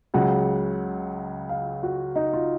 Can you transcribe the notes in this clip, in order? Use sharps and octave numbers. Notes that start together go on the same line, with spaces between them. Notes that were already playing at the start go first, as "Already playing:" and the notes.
C#2 C#3 F#3 F#5
F5
F#4
D#4
F4